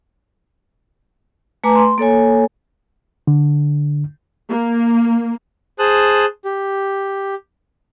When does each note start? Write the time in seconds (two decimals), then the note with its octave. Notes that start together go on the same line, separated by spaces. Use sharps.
1.64 A3 B4 G#5 A#5 D6
1.75 C6
1.98 A#3 A4 C#5 G#5
3.27 D3
4.49 A#3
5.79 G#4 C5 A5 D#6 F#6
6.45 G4